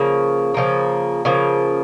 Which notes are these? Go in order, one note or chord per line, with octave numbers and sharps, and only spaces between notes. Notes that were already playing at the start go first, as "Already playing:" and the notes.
Already playing: C#3 F3 A#3
C#3 F3 A#3
C#3 F3 A#3